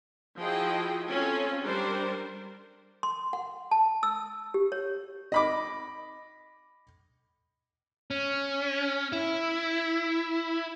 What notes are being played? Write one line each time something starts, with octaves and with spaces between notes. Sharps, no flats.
F3 E4 F#4 G#4 D#5 G5
C4 C#4 F4 A4
G3 D4 A#4 C5
C6
F#5
A5
E6
G4
C#5
D#5 B5 D6
C#4
E4